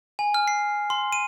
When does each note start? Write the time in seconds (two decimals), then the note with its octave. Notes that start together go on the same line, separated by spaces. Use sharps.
0.19 G#5
0.34 F6
0.48 C7
0.90 C6
1.12 D#7